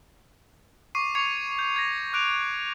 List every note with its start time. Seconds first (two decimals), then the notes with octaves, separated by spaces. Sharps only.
0.95 C#6 D6 C7 D#7
1.15 C#6 G#6 C7 C#7 F7
1.59 G6
1.76 G#6 A#6
2.13 D6 F#6 D7 F7